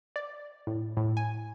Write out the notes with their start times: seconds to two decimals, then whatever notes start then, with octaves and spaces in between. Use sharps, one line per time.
0.16 D5
0.67 A2
0.97 A2
1.17 G#5